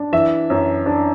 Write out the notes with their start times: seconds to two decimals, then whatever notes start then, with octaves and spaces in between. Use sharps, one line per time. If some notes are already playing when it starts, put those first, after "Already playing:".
Already playing: D4
0.12 E3 E5
0.50 F#2
0.86 D4